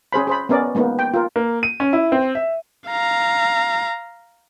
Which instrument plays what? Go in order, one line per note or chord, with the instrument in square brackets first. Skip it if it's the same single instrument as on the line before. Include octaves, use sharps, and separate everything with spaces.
[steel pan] C#4 G#4 C5 B5
G#4 C5 B5
B3 C#4 A#4 D5 D#5
G#3 A#3 B3 D#4
G5
F4 A#4
[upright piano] A#3
D#7
C#4
E4
C4
E5
[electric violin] F5 A#5